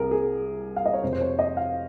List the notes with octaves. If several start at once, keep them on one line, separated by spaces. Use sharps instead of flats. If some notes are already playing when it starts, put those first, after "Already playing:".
Already playing: C2 C3 G#4 A#4
G#4
F5
D#5
C#5
F1 F2 C3 C5
C5
C#5
D#5
F5